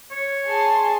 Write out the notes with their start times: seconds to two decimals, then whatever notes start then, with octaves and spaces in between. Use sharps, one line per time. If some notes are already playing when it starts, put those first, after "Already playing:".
0.11 C#5
0.49 G#4 A5 C6